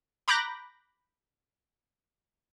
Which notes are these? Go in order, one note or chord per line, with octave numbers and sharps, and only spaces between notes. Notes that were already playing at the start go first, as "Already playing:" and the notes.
A#5 B5 D6 F#6 G6 A#6